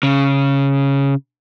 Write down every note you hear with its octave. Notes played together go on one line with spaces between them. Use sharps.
C#3